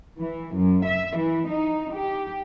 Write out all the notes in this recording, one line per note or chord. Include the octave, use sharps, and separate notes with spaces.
E3
F#2
E5
E3
D#4
G4